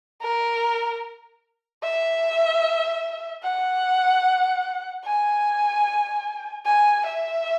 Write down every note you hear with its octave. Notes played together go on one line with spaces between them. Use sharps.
A#4
E5
F#5
G#5
G#5
E5